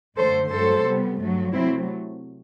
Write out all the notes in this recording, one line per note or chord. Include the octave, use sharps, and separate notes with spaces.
F#2 D3 A3 A4 C5
G2 F#3 A3 A4 C5
C3 G3 B3
G2 F#3 A3
C3 F#3 A3 C4 E4